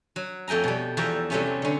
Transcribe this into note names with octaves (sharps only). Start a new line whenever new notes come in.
F#3
F2 A3 G5 G#5 A#5
B2 G3
E2 F3 F#4 E5 G5 A#5
C3 F#3 G3 A3 B3 C#4
D3 C#4